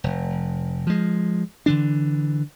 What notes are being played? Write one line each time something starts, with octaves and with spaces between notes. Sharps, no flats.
F1
F3 G#3
D3 E3 D4